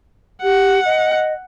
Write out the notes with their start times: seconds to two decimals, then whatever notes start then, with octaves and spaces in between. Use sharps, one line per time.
0.43 G4 F#5
0.85 D#5